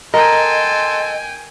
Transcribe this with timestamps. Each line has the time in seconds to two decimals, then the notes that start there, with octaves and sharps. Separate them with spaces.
0.14 A4 A#4 D#5 G5 G#5 C6